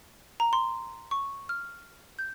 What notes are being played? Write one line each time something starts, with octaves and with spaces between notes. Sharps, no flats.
A#5
C6
C#6
F6
G6